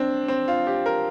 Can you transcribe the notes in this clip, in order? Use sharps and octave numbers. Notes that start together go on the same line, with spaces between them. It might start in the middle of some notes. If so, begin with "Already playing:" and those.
Already playing: C4 D4
C4
F4
G4
A#4